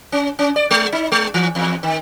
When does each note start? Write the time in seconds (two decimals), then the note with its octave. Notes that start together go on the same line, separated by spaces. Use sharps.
0.12 C#4
0.39 C#4
0.56 D5
0.71 G#3
0.92 D#4
1.12 G#3
1.34 E3
1.55 E2
1.83 D#3